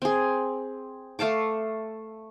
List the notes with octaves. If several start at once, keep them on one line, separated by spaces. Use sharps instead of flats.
C4 G#4
A3 F5 A5 D6